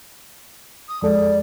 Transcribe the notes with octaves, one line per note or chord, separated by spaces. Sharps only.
D#6
F2 G#3 A4 D5